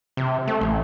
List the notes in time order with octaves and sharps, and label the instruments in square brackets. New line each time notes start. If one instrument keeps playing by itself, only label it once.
[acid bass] C3
A3
A1